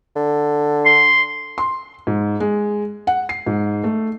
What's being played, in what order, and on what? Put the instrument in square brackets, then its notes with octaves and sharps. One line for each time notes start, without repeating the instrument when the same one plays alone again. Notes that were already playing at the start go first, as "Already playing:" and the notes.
[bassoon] D3
[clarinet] C6
[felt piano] C6
G#2
G#3
F#5
C7
G#2
A3